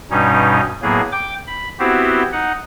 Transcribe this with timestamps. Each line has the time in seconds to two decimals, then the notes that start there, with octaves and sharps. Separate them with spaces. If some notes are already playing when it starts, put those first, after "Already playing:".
0.11 G2 B2 G3 C#4 D#4
0.82 A2 F#3 A#3 B3 G#4
1.12 G5 D6
1.47 B5
1.79 B3 C4 E4 F#4 G4 C5
2.32 D#4 F#5